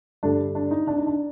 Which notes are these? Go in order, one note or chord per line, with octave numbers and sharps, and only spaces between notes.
G2 D3 A3 D4
D4
D#4
D4
D#4
D4